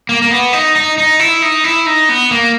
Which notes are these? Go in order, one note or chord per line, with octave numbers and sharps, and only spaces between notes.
A#3
A#3
B3
D#4
D#4
D#4
E4
D#4
E4
D#4
B3
A#3